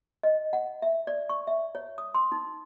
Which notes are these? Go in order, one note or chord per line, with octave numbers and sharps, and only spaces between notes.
D#5
F#5
E5
D5
C#6
E5
C#5
D#6
C6
D#4